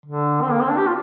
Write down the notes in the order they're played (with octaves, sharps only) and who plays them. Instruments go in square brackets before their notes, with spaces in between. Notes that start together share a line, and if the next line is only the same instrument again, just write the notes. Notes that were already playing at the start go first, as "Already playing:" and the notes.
[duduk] D3
C4
A#3
C4
D4
G4
F4